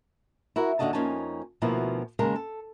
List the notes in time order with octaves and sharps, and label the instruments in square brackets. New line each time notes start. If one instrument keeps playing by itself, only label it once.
[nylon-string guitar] E4 F#4 A#4
D#2 D3 F#3 F#4 D#5 A5
F2 A#3 C#4 D#4 G#5 A5
D2 B2 F3 A#3 E4
D#2 C#3 G#3 A#4 F5 A5
A4